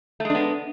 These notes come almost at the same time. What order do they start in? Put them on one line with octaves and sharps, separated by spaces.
A3 G#3 D4 B3